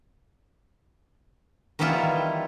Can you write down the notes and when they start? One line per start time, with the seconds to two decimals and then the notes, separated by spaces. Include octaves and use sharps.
1.79 D#3 E3 G3 B3 E4 F4